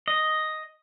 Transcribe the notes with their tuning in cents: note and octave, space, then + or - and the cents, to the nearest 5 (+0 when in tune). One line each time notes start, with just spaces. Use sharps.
D#5 +0